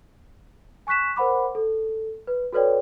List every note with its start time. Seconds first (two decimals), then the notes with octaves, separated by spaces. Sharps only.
0.87 G#5 C#6 F#6 B6 E7
1.16 A#4 C5 F#5 B5 D6
1.55 A4
2.27 B4
2.53 F#4 A4 B4 C#5 D5 G5